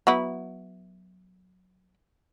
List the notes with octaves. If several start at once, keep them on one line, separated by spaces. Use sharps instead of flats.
F#3 B3 E4